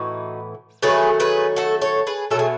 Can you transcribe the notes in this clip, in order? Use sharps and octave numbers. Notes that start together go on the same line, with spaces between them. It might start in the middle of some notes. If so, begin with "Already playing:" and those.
Already playing: A2 E3 B3 D#4 F#4
D#3 F#3 A3 G#4 B4
G#4 B4
F#4 A4
A4 C#5
G#4 B4
B2 F#3 A3 A4
G#4